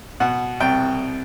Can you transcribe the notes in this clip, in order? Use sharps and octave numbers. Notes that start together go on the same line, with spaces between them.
B2 F#5
C2 G5